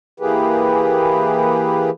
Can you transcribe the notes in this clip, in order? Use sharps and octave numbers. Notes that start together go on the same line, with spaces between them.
E3 A#3 G4 G#4 B4